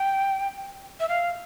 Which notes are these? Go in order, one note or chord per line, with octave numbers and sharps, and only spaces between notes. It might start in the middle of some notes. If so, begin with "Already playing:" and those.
Already playing: G5
E5
F5